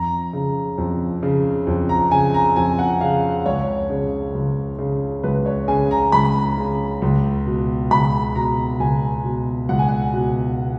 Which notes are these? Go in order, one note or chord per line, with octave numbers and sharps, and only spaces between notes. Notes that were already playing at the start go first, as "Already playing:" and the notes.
Already playing: F2 A#5
C#3
F2
C#3
F2
A#5
C#3 G#5
A#5
F2 G#5
F#5
C#3 F5
C#2 C#5
C#3
C#2
C#3
C#2 B4
C#5
C#3 G#5
A#5
C#2 B5
C#3
C#2
B2
C#2 B5
B2 A#5
C#2 G#5
B2
C#2 F#5
G#5
F#5
B2